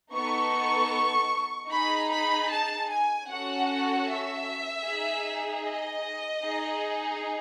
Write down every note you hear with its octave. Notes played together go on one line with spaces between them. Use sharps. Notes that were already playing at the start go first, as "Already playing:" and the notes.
B3 D#4 A4 C#6
D#4 G#4 B5
B5
A5
G#5
C#4 F#4 A4 F#5
E5
D#4 G#4
D#5
D#4 G#4